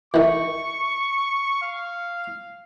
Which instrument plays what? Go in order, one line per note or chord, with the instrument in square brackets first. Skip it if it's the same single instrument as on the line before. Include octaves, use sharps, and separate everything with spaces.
[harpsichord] D#3 E3 [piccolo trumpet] C#6
[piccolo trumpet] F5